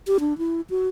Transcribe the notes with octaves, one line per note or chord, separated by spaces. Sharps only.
G4
D4
E4
F#4